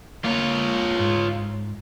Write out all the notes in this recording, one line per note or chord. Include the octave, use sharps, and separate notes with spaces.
A#3 F4 C#5
G#2